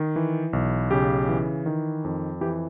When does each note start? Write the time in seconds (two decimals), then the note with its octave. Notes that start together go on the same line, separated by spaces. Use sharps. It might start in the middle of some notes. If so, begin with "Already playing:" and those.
Already playing: D#3
0.16 E3
0.53 B1
0.91 C#3 G4
1.29 E3
1.66 D#3
2.04 F2
2.41 E3 G4